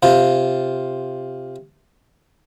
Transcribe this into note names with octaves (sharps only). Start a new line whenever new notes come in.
C3 F4